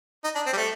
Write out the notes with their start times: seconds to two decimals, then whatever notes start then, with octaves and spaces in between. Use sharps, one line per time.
0.24 D#4
0.35 D4
0.47 C4
0.53 G3
0.57 A3